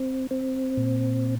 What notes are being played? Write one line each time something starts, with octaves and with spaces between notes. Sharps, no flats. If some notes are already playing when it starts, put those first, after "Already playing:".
Already playing: C4
C4
A#2